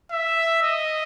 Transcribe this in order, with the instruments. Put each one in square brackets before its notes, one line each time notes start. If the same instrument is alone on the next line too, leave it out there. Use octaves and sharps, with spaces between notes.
[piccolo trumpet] E5
D#5